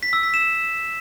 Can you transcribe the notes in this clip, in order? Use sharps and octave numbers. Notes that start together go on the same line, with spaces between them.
B6
E6
B6
E7